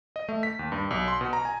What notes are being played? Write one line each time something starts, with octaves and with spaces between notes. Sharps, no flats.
D#5
A3
B6
D#2
G2
B1
C6
B2
A#5
G#5